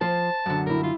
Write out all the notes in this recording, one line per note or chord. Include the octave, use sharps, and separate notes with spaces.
F3 C5 A5
F#2 D3
G3 E4 A#4
F4